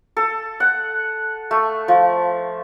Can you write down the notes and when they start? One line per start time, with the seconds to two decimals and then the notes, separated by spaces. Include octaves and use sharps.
0.17 A4
0.60 F#5
1.51 A3
1.88 F3